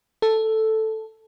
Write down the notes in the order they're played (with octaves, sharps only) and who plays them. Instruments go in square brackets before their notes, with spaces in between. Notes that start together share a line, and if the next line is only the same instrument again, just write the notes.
[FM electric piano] A4